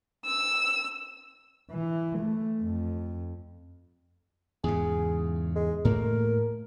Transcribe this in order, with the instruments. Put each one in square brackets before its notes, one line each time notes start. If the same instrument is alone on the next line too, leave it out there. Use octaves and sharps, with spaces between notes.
[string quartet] E6
[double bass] E3
A3
F2
[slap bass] E2 G#2 C#3 [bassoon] G#4
[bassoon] G#3
[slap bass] A2 A3 A#3 [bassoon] A#4